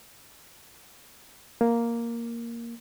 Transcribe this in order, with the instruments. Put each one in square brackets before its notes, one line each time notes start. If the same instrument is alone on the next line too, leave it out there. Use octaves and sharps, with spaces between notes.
[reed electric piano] A#3